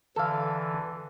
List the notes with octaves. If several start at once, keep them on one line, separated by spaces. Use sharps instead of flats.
D3 E3 A4 F5